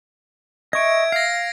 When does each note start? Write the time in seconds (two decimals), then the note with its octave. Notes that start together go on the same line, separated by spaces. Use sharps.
0.73 D#5 E5 C#6 G#6 D7
1.12 F5 A#6 C7